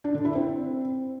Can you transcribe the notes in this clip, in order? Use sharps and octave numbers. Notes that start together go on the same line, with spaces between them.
D4
D3
E4
C4